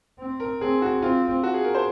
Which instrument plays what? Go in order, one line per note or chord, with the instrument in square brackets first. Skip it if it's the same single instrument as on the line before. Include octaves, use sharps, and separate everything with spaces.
[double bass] C4
[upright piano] A#4
[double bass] C4 [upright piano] G#4
[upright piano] F#4
[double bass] C4 [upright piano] F4
[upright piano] F#4
G#4
A#4
C5